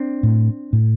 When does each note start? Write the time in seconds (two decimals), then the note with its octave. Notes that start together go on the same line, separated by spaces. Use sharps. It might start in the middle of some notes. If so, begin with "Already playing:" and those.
Already playing: C4 D4
0.23 A2
0.73 A2